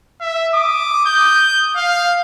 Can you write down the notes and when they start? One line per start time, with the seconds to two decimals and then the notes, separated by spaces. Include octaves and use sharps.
0.21 E5
0.54 D6 D#6
1.06 G6
1.76 F5